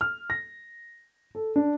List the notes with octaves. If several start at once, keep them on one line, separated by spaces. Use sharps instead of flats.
F6
A#6
A4
D4